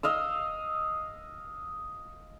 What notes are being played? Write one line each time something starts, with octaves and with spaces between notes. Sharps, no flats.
D#5 F5 E6